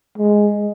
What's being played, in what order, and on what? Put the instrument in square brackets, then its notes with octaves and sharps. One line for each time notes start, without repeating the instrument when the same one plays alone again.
[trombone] G#3